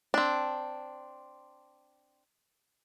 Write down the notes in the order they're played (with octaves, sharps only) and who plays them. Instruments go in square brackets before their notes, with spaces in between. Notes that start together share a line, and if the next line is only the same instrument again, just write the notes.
[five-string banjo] C4 D4